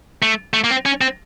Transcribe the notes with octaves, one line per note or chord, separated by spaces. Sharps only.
A3
A3
A#3
C4
C#4
C4